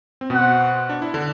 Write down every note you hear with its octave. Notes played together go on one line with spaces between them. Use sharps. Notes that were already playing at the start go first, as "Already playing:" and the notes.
C4
B2 B3 F#4 C5 F#5
D4
E4
D3 D4